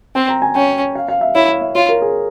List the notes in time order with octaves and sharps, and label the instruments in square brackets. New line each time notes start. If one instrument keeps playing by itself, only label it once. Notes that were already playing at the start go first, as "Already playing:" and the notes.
[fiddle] C4 [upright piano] G5
[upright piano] A#5
G#5
[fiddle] C#4 [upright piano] G5
[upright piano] F5
F5
E5
[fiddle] E4 [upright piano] C#5
[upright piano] F5
E5
[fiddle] F4 [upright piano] C#5
[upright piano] A#4
G#4